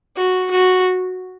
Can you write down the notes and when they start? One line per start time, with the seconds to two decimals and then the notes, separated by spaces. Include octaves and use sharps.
0.17 F#4
0.51 F#4